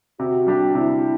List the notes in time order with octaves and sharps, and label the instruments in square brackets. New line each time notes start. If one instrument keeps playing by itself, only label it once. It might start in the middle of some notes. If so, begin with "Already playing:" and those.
[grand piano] C3 [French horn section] F#4
[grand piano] G3 D4 G4
[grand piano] C3 [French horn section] E4